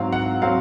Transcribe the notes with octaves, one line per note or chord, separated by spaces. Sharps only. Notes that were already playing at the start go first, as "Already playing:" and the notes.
Already playing: G#2 F#3 C4 F5
F#5
F#3 C4 F5